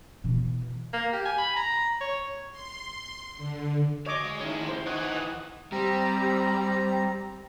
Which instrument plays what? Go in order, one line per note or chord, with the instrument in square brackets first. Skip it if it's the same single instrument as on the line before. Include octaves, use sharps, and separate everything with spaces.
[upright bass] B2 E3
[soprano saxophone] A#3
G4
G#5
B5
A#5
C#5
[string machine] C6
D3
[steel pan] C#5 D#5 D6 [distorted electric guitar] F5
[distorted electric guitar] G#3
[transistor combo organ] D#3 [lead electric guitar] C#4 E4
[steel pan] C5
[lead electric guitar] D#3 E3 [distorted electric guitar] B4 G#5 [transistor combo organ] D#5 F#5
[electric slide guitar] G3 [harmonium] C4 A#5